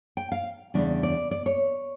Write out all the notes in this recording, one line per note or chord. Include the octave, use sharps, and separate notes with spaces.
G5
F5
E2 C#3 G3 D4
D5
D5
C#5